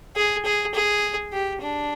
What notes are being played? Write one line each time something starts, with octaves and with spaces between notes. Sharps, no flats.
G#4
G#4
G#4
G4
D4